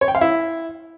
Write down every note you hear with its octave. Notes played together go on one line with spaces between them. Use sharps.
C#5
G5
F5
E4